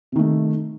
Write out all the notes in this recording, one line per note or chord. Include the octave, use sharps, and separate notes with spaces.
C3 D#3 A3